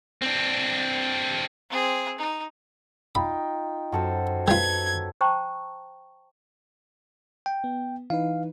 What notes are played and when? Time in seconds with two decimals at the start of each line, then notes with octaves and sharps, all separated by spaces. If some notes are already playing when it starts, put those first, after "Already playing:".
0.22 C4 D4
1.70 C4 G#4
2.18 D#4
3.15 D#4 F4 G5 B5
3.92 F#2 F#4 A4 C5
4.48 G3 F4 B4 G#6 B6 C7
5.21 C5 G5 A5 A#5 C#6
7.46 G5
7.64 B3
8.10 E3 D#4 B4 F5